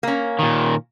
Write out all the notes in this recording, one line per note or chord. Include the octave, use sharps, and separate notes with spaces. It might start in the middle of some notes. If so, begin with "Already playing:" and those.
A#3 C#4
A#2 D#3